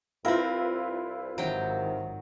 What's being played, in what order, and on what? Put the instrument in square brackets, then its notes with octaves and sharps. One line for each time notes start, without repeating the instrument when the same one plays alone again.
[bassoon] C2 [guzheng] C4 A#4 [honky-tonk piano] E4 F4 B4
[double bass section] G#1 D#3 [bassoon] C3 [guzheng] F#3 G5